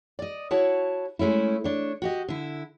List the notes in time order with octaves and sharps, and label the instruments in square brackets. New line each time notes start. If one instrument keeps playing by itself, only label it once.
[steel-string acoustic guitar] D5 D#5
E4 F#4 C#5 A5
G#3 A3 C#4 E4
D4 C#5
F#4 G4 D#5
D3 E4